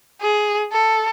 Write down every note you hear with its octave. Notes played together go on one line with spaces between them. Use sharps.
G#4
A4